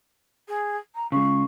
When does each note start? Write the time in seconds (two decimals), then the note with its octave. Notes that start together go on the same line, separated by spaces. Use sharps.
0.48 G#4
0.95 A#5
1.12 C#3 G#3 C#6